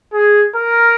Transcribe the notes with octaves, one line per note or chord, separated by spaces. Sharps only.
G#4
A#4